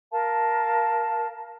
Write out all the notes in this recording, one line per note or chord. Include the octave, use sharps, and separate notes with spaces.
A#4 F5 A5